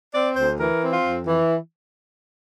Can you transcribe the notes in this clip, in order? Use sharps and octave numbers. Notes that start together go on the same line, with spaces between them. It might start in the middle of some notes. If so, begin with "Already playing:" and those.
C4 D5
D2 C5
E3 A#4
C4
F4
F2
E3